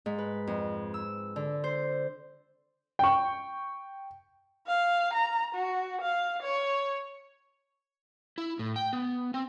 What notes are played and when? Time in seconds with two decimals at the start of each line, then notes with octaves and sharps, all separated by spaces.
0.06 G#2
0.18 B4
0.47 F2
0.94 E6
1.36 D3
1.64 C5
2.99 G5 C#6
4.67 F5
5.13 A#5
5.55 F#4
6.02 F5
6.43 C#5
8.38 E4
8.59 A2
8.76 G5
8.93 B3
9.34 C4